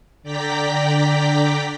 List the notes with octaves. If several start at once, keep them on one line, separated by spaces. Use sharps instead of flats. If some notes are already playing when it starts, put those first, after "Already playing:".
D3 D5 G5 A#5 B6